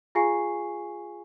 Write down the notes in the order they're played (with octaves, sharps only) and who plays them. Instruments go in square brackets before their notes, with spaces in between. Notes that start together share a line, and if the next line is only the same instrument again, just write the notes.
[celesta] F4 G#4 F5 G#5 C#6 C7